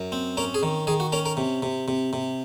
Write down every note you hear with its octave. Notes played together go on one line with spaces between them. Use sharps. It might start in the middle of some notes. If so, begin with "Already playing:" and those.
Already playing: F#2
C4
C#4 A#4
G#4
D#3
D#3 G#4
F#4
C#4 A#4
A#4
C3
C3
C3
C3